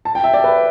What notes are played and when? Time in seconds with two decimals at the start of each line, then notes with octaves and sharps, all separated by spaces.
0.05 A5
0.15 G5
0.24 E5
0.34 D5
0.44 B4